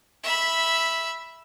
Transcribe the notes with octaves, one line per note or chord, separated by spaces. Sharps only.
E5 B5